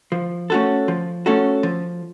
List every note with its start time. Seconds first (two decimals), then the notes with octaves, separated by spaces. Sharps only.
0.12 F3
0.50 A3 C#4 F#4 A4
0.88 F3
1.26 A3 C#4 F#4 A4
1.63 F3